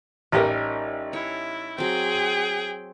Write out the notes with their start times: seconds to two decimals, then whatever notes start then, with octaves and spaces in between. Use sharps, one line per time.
0.32 A1 G3 C#4 D#4 G4 A#4
1.13 E4 C#5
1.78 F#3 C4 G#4 G5